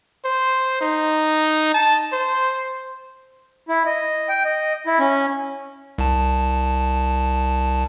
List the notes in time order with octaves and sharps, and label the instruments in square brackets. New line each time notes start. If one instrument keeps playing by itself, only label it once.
[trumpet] C5
D#4
A5
C5
[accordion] E4
D#5
G5
D#5
E4
C#4
[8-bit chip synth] C2 A5